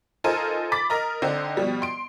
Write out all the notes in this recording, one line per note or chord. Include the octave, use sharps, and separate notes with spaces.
D#4 F4 A4 A#4 C5 G#5
B5 D6 A6 B6
A#4 D#5 A#5
D3 C4 D#4
B2 F3 G3
C6 D7